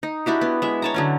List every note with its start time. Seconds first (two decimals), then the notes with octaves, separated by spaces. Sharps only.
0.03 D#4
0.26 D4 E4 F#4 G4
0.41 B3
0.62 G#3 E5
0.82 C#5 A5 A#5
0.94 D3 F#3 C#4